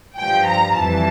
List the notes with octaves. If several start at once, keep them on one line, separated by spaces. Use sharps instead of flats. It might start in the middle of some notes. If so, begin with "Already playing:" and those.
G2 F3 G5
A#5
F2 E3 G3 A5